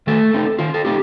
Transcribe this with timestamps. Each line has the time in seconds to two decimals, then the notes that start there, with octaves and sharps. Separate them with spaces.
0.07 D#3 A3 A4
0.33 A3 C4 D#4
0.59 D#3 F4
0.74 A4
0.85 A3 C4 D#4 G4